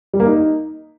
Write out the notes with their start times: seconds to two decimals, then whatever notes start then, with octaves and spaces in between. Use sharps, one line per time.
0.13 G3
0.20 A#3
0.26 D#4